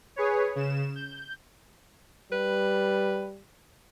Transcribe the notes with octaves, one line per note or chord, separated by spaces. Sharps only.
G#4 B4 C#5
C#3 E7
G6
G3 B4